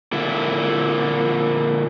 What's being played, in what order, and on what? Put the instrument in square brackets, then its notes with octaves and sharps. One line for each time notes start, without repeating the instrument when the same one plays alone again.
[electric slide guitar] A#2 D3 E4